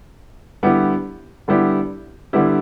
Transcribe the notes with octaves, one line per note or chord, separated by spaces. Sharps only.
D3 G3 B3 E4 G4
D3 G3 B3 E4 G4
D3 G3 B3 E4 G4